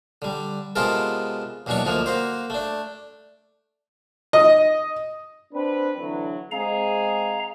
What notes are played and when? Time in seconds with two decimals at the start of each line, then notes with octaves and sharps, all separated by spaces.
0.22 D3 G3
0.76 C3 G#3 B3 F4 A4 A#4
1.66 D#2 B2 E3 F#3 D4 C#6
1.85 D2 D#3 F3 A#3
2.06 A#3 F#4 C5
2.50 A3 D4
4.33 D#5
5.54 C4 D4 B4
5.99 D3 E3 F#3
6.52 G#3 C4 G#4 F5 A#5